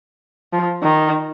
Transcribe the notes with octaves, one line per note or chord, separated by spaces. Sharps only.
F3
D#3